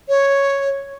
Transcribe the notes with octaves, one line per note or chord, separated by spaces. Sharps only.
C#5